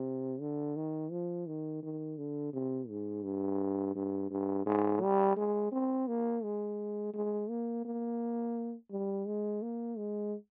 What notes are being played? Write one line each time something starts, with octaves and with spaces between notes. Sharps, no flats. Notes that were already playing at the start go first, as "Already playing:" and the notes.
Already playing: C3
D3
D#3
F3
D#3
D#3
D3
C3
G#2
G2
G2
G2
G#2
G3
G#3
C4
A#3
G#3
G#3
A#3
A#3
G3
G#3
A#3
G#3